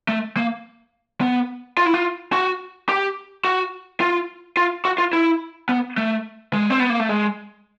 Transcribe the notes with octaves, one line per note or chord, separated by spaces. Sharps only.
A3
A#3
B3
F4
E4
F4
F#4
G4
F#4
F4
F4
F#4
F4
E4
B3
A3
G#3
C4
B3
A#3
A3
G#3